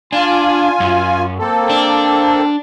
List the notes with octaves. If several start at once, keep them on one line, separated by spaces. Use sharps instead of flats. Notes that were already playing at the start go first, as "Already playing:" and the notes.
D4 F4 G#5
F#2
A#3 C4 A4
D4